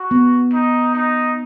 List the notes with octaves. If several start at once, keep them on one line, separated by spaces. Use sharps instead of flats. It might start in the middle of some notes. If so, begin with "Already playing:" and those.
Already playing: F#4
B3
D#4
D#4